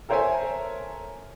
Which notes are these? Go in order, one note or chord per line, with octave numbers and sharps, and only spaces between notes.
A4 A#4 C5 C#5 E5 G#5